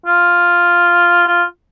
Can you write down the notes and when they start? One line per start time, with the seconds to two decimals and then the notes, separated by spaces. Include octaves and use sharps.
0.06 F4
1.27 F4